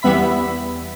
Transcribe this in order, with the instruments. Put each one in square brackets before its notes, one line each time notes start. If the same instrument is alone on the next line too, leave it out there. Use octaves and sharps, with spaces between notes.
[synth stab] E2 G3 B3 E5 B5 B6